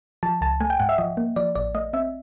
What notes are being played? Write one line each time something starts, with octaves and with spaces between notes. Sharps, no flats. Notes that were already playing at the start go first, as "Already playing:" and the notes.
F3 A5
C#2 A5
A3 G#5
G5
G#2 F#5
E5
F3 D#5
A#3
F3 D5
A1 D5
A3 D#5
C4 E5